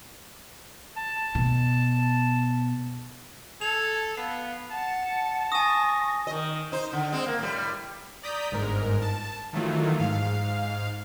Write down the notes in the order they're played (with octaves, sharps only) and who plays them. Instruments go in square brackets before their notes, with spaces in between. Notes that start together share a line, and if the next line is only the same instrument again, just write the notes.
[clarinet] A5
[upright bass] B2
[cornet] A4 [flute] G#6 [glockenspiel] F7
[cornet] B3 [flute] F5 [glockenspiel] C7
[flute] F#5 [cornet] A5
[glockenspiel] G#5 D#6 [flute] C#6 [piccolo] A#6
[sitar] D#3 D#5
D#4 C5
D3
G#3 C4
A#3
A2 G3
[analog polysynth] D5 A#5 D#6 G6 B6
G1 G#2 A#4
A5
D#3 E3 F#3 A3 F4
G#2 F5